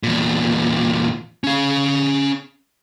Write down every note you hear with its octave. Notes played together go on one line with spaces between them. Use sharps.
E2 A#2
C#4 F5